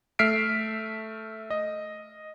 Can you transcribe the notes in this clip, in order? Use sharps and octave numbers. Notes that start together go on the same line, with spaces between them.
A3 E5 F6 B6 C7 D7
D#5